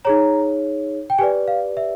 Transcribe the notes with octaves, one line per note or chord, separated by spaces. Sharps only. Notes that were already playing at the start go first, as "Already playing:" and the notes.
D#4 G#4 C#5 A#5
G5
G4 B4 D5 G#5
F5
E5